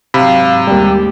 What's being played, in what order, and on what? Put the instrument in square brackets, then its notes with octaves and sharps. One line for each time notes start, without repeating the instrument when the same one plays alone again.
[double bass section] G#2 F#3 [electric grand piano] C3 [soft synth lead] F5 [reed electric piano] B5
[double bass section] D#2 G#3 [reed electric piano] G3 A#3 [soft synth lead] G4